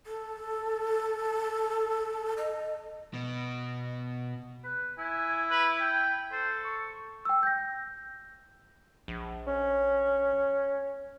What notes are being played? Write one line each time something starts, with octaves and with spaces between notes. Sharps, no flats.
A4
D#5
B2
B4
E4 G#5
B4
G5
A4 C5
C#6
G5 E6
G6 A#6
A#1
C#4